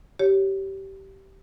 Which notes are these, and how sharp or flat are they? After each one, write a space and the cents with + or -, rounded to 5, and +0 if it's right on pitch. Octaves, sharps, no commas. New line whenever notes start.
G4 -20 C#5 +0